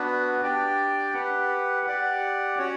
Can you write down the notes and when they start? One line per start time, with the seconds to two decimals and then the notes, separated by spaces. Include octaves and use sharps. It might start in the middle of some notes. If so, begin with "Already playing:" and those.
Already playing: B3 D4 F#4 B4
0.41 D4 G4 D5 G5
1.13 G4 B4 F#5
1.86 G4 D5 F#5
2.58 C#4 F#4 C#5 F#5